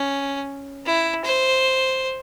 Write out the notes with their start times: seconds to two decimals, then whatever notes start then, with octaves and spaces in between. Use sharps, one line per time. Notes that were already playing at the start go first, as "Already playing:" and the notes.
Already playing: C#4
0.86 E4
1.24 C5